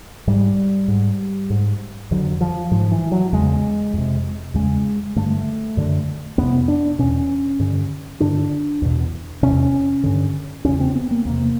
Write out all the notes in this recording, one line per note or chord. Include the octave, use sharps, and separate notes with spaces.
G#2 G3
G#2
G#2
F2 D3 F#3
F3
G#2 F3
E3
F#3
E2 C#3 G#3
F2 C3
E2 C#3 G#3
G2 D3 A3
F#2 D3
F2 C3 B3
D4
E2 B2 C#4
G2 D3
G2 D3 D4
E2 B2
E2 C3 C#4
G2 D3
E2 C#3 C#4
C4
B3
A#3
E2 C3 A#3